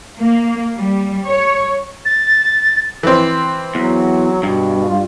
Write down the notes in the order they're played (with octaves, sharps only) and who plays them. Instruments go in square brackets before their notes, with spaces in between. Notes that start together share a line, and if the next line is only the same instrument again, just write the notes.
[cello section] A#3
G3
C#5
[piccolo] A6
[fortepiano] E3 C4
[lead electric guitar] E2 [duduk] F#3
[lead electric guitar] G2 [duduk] B2
[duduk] F4